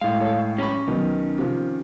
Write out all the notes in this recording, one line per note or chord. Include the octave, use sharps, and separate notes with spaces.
A2 G#3 F5
A4 C#5
C#4 G4 C#5 B5 C#6
B1 D#3
C3 F3